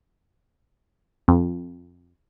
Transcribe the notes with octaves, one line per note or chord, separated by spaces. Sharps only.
F2